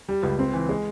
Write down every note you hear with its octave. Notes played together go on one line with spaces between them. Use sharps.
G3
C#2
C4
E3
G#3